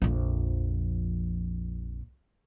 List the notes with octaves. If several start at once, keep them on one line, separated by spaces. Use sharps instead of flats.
A#1 F2